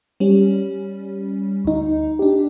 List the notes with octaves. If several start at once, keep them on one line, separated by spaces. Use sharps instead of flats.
G3 C#4
D2 D#4
D4 G4